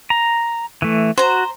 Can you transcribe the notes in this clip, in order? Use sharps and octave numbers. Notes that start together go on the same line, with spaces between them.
A#5
E3 A3
F#4 C5 A#5